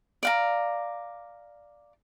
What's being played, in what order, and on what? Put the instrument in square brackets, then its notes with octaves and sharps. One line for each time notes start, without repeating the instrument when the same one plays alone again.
[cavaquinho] D5 F5 A#5